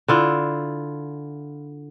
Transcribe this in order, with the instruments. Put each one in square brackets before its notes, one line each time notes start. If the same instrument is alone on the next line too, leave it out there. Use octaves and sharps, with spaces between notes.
[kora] D3 E4 F4